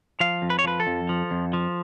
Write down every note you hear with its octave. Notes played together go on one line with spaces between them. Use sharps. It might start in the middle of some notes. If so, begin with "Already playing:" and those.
F3 F5
F2
B4
C#5
F3 B4
A4
F2
F3
F2
F3